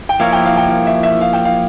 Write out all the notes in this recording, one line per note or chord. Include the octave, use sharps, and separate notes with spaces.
G5
F3 A#3 E4 A#4 C#5 F5
G5
F5
G5
F5
E5
E5
F5
G5
F5